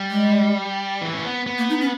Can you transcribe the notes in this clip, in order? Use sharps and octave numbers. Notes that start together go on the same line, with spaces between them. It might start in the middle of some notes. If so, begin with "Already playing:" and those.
Already playing: G3
G#3
E3
C#4
B3
B3
A#3
D#4
C#4